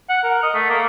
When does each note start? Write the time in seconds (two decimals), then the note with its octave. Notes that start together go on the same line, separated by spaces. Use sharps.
0.09 F#5
0.23 A#4
0.43 D#5
0.54 A3
0.70 A#3